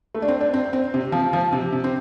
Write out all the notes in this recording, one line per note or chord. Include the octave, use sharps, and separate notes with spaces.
A3
D4
C4
D4
C4
C4
C3
F3
F3
C3
C3
C4